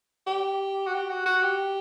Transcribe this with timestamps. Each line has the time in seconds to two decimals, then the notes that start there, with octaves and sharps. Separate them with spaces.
0.27 G4
0.87 F#4
0.94 G4
1.09 F#4
1.26 F#4
1.43 G4